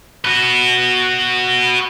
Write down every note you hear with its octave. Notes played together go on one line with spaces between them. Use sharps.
F#4 B4